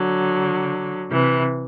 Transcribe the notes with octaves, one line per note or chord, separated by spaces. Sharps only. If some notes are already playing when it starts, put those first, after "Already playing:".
Already playing: D3 F#3
C3 E3